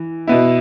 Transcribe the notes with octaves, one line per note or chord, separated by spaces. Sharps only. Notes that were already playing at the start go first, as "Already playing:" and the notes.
Already playing: E3
B2 B3 E4